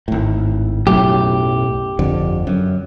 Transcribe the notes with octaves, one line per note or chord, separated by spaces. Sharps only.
G#1 A2
B1 F#2 A2 G4
G1 F2 D3
F#2